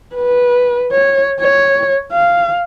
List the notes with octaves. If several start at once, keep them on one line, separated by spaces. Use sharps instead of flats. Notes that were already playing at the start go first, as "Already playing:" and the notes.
B4
C#5
C#5
F5